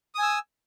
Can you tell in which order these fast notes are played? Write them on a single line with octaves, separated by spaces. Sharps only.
D#6 G#5 E6